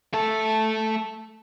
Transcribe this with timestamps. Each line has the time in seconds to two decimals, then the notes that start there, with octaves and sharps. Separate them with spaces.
0.14 A3 A4